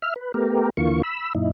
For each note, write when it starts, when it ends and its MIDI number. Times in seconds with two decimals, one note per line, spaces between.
0.02 0.14 76
0.02 0.14 89
0.16 0.32 71
0.34 0.70 57
0.34 0.70 59
0.34 0.70 67
0.34 0.70 70
0.77 1.02 39
0.77 1.02 50
0.77 1.02 52
0.77 1.02 58
0.77 1.02 65
0.77 1.02 85
1.03 1.33 83
1.03 1.33 88
1.35 1.51 42
1.35 1.51 46
1.35 1.51 63
1.35 1.51 64